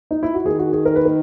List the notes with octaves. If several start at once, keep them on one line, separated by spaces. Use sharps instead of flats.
D#4
E4
F#4
D#3 G#4
F#4
G#4
A#4
B4
A#4